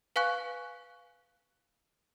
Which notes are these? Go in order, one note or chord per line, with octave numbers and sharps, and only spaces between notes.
B4 F5 G#5 C#6 F#6